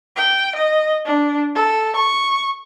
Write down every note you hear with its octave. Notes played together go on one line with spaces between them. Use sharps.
G5
D#5
D4
A4
C#6